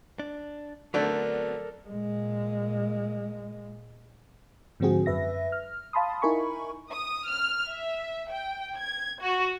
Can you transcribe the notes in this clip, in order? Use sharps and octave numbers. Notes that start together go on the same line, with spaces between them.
D4
D3 F#3 A3 B3 C4 A4 A#4 D5
A#2 G#3
G#2 D3 F3 C4 F#4 G#4
F#2 B4 E5 A#6
F6
F5 A5 B5 C6 D#6
D#4 E4 A#4 G#5 B5 C#6
D#6
F6
E5
G5
G#6
F#4